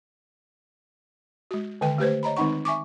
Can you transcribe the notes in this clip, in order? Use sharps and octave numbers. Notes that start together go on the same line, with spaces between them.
G#3 F#4
D3 D#3 G#3 B4 G5
A3 G4 B4 C5
C#5 D#5 A#5 B5
D#3 G#3 C4 D#4 F#5 C#6
E5 G#5 C#6 D6